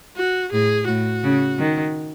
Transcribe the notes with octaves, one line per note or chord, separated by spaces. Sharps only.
F#4
A2 G#4
A2 F#4
C#3
D#3